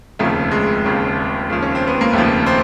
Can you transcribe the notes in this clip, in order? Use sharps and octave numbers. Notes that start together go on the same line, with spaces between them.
F1 D#2 C#3 F3 A3
G#3
F1 D#2 C#3 F3
F1 D#2 C#3 F3
C#4
C4
B3
A#3
F1 D#2 C#3 F3 A3
C4